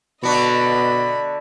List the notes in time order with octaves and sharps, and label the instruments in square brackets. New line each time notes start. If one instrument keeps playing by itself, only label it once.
[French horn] B2 [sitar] D3 D4 F#4 [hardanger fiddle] D#5 B5